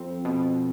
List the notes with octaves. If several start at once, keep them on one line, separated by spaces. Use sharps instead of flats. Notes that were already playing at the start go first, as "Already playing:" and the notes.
Already playing: F2 C4
B2